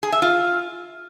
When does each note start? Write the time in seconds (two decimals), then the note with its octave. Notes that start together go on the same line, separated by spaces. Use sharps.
0.03 G#4
0.12 E5
0.22 F4